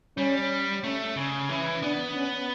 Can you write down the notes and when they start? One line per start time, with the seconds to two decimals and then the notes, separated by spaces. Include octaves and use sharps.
0.17 G3 C#4
0.84 A3 C#4
1.16 C#3 C#4
1.49 E3 C#4
1.83 B3 D4
2.15 C#4